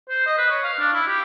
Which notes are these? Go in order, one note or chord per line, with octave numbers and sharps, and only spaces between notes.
C5
D#5
B4
C#5
F5
D4
E4
G4